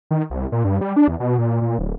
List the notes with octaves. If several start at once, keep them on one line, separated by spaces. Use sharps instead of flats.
D#3
C2
A#2
G2
G3
D4
E2
B2
A#2
A#2
D1